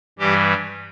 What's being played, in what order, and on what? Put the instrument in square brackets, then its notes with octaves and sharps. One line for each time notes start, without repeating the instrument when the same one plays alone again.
[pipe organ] G2 E3 G3 G4